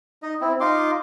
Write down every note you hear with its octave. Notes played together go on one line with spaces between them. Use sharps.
D#4 D#5
C4 E4
D#4 F4 C6 D6